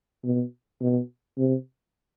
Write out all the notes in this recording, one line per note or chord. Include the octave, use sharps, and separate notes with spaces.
B2
B2
C3